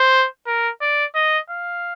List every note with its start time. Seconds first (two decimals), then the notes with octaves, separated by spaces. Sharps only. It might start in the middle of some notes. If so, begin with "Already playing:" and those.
Already playing: C5
0.47 A#4
0.81 D5
1.15 D#5
1.50 F5